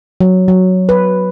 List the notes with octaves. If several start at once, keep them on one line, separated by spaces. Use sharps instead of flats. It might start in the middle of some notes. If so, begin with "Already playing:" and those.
F#3
F#3
B4